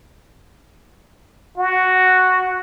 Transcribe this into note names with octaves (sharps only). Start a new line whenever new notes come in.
F#4